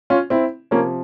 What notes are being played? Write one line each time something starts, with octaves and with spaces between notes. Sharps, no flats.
C#4 F4
C4 E4
C3 F3 A#3 C#4